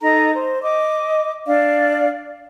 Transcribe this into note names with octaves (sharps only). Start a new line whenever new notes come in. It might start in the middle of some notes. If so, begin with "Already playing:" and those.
D#4 A4 A#5
C5
D#5 D6
D4 D5 F5